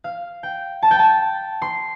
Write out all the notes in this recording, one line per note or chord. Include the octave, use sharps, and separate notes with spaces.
F5
G5
A5
G5
A5
C6